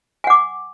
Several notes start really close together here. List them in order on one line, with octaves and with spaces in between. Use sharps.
G#5 F#5 D6